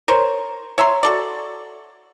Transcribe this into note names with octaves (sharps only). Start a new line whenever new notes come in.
A#4 C5 C#5
C#5 E5 A#5 C6
F#4 A4 D5